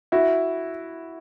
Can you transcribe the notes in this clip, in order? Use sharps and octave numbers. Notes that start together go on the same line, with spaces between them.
E4 F#4